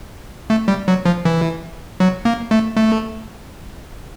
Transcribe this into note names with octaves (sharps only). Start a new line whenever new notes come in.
A3
G3
F#3
F3
E3
F#3
A#3
A3
A3